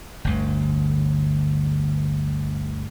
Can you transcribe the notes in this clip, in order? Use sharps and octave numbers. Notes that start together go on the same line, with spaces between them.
G1 D2